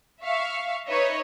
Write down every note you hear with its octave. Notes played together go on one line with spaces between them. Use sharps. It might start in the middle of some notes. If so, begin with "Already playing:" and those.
E5 F5 C#6
D#4 B4 C#5 D#5 E5